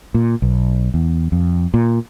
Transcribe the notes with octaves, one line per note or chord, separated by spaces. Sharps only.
A#2
B1
E2
F2
A#2